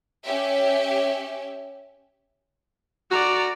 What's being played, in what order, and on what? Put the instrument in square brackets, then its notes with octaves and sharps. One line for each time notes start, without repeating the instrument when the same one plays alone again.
[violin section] C#4 G4 E5
[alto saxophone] F#4 [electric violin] D5 A#5